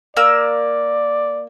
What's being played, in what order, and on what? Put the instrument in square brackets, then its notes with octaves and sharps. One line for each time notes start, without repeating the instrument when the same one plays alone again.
[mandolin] A#3 E6 [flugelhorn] D5